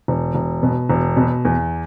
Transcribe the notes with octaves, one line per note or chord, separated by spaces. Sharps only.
E1
E1
B2
E1
B2
E2